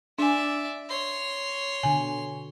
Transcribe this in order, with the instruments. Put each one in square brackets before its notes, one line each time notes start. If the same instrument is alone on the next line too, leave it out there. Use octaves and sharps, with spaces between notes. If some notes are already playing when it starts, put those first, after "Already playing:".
[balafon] D4 G#5 [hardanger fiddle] D5 E5
[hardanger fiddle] C#5 C6
[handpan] B2 D3 [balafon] G#5